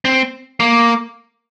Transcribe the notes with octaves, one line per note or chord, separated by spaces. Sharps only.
C4
A#3